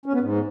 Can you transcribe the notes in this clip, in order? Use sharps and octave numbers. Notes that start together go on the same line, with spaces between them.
C#4
B3
G#2